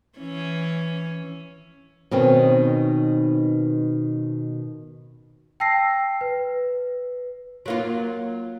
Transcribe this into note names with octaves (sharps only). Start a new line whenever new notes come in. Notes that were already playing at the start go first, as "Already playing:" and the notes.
E3 C#4
B2 D#3 C4 C#4
G5 A5 E6 A#6 C7
B4
F#3 A#3 F4